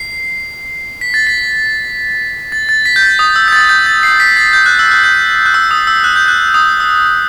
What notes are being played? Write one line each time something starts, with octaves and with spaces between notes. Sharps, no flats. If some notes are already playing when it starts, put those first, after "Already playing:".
Already playing: C7
B6
A6
B6
A6
A6
B6
G6
A6
D#6
E6
G6
A6
G6
A6
C7
B6
A6
G6
F#6
E6
F#6
G6
F#6
E6
D#6
E6
F#6
G6
F#6
D#6
E6